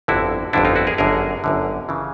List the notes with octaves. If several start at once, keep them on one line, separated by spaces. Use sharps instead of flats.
G1 F2 D3 E4 F#4
G1 F2 D3 D4 E4
D#4 F4
E4 F#4
G#4 A#4
G1 F#2 D3 G#4 A#4
G1 F#2 D3
C#3 E3